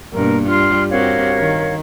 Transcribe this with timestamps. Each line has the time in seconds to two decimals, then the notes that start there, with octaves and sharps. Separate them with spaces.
0.13 G2 B2 A#3 A#4
0.49 G3 F4 C6 F6
0.90 C4 F#4 G4 A#4 C#5 F5
1.39 D#3